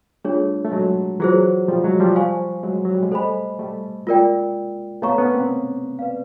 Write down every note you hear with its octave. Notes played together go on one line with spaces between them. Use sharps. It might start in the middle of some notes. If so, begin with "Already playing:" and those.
G3 A3 D4 F4 G#4 C#5
A3
F#3 G#3
E3 F#3 F4 G#4 C5
F3 G3
F#3 G#3
F3 G3
C5 F5 G#5 C#6
F#3 G#3
F#3
G3
G#3
G3 A3 A4 C5 D#5 G#5 B5
G3 A3
G#3 A#3 F4 A#4 D5 G5
A3 B3 C#5 F5 A#5 C#6
B3 C#4
A#3 C4
B4 D5 F5